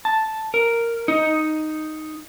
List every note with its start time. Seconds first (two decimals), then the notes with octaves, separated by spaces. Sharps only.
0.05 A5
0.54 A#4
1.08 D#4